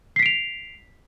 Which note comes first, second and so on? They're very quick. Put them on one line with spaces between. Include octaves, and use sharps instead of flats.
C7 B6 D7 F7